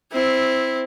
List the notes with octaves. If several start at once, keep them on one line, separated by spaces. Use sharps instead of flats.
C4 E4